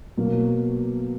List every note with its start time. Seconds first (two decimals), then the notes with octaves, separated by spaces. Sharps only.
0.17 B2 F#3 A#3